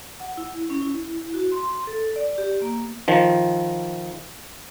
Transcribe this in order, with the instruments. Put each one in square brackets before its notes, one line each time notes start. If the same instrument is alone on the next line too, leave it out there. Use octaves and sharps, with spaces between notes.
[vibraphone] F#5
E4
C#4
E4
F#4
C6
A4
D5
G4
A#3
[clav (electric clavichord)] D#3 F3